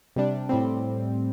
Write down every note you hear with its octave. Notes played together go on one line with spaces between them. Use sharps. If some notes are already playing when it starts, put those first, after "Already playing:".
C3 G3 D4
A2 G3 C4